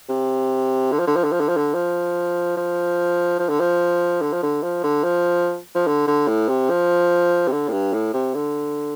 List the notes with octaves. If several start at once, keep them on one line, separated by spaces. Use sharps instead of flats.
C3
D3
F3
D3
F3
D3
F3
D3
F3
D3
F3
F3
F3
D3
F3
D3
F3
D3
F3
D3
F3
F3
D3
D3
A2
C3
F3
C3
D3
A2
G2
A2
C3
D3